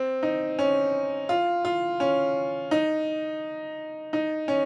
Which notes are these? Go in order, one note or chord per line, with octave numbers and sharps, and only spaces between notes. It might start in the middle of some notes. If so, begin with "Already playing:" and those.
Already playing: C4
D#4
C#4
F4
F4
C#4
D#4
D#4
C#4